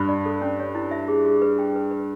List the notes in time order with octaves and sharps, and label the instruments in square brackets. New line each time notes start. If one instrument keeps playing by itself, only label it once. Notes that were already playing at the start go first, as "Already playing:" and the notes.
Already playing: [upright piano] G2 [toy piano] B5
[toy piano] D5
A4
C#4
C#5
E4
E5
G#4
G#4
B4
G5
B4
B4